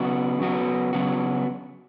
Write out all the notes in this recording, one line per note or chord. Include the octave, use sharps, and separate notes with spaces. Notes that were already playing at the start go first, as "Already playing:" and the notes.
Already playing: C#3 F#3 B3 F#4
C#3 F#3 B3 F#4
C#3 F#3 B3 F#4